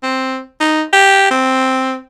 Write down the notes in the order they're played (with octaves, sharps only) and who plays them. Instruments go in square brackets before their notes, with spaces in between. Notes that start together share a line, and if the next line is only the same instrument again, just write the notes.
[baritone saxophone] C4
D#4
G4
C4